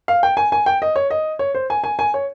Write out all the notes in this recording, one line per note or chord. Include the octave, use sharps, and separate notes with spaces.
F5
G5
G#5
G#5
G5
D#5
C#5
D#5
C#5
C5
G#5
G#5
G#5
C#5